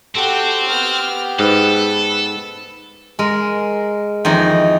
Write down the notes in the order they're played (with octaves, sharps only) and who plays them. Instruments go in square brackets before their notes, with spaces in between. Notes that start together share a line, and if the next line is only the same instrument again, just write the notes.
[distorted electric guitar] C4 [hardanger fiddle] F#4 G4 [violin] A4
[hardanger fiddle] B3 G4 [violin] F6
[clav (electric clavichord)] G#2 [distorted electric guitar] A4 [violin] B4
[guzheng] G#3 A#4
F2 D#3 E3 D#4